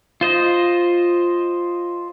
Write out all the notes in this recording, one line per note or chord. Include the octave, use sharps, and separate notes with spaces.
F4 C5 D#5